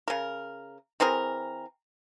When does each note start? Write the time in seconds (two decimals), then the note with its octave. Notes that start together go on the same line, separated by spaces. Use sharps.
0.08 C#3 A#4
1.00 E3 C4 G#4 A#4